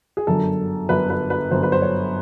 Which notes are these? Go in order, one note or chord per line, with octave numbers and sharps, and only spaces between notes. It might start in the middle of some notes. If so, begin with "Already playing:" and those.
G#4
G1 F#2 D3 F#3 A4
G1 F#2 D3 F#3 B4
B4
B4
G1 F#2 D3 F#3 C5
B4
C5
C#5